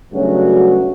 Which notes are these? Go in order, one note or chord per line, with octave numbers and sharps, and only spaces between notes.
G2 C#3 F#3 A3 C#4 F#4